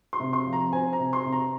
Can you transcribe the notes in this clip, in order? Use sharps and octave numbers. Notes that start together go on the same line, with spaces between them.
C6
C3
C6
F3
A#5
C4 G#5
A#5
C3
C6
C3
A#5